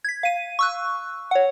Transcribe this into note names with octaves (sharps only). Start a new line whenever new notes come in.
G#6 B6
F5 D#7
C#6 E6 F#6
C#5 F#5